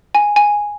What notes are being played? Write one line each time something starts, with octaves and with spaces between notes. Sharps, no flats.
G#5
G#5